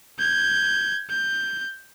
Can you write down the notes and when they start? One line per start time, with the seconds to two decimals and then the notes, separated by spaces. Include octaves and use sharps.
0.19 G6 G#6
1.10 G6